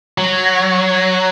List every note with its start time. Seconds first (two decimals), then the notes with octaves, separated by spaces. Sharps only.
0.18 F#3